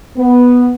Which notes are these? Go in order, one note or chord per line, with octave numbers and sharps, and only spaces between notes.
B3